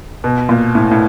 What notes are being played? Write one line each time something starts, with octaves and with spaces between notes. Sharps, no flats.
B2
A#2
A2
A2